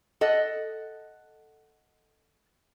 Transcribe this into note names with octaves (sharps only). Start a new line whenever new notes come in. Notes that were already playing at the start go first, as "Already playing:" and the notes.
A4 D#5 F#5